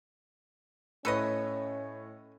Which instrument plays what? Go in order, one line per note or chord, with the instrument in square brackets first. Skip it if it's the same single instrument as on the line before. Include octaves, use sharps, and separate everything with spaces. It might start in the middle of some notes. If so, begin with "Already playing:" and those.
[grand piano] A2 C#5 [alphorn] C#4 [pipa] A4 B4 D#5